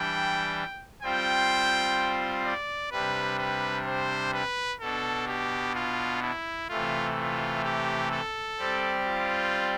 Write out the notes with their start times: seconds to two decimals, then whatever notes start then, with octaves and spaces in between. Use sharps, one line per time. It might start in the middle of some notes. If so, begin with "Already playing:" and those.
Already playing: E3 G3 D4 G5
1.02 G3 C4 F4 C5 G5
2.44 D5
2.91 C3 G3 D4 B4
3.38 B4
3.86 C5
4.33 B4
4.80 B2 B3 D4 A4
5.27 G4
5.75 F4
6.22 E4
6.69 C3 E3 A3 F4
7.17 F4
7.64 G4
8.11 A4
8.59 G3 C4 G4 D5
9.06 F4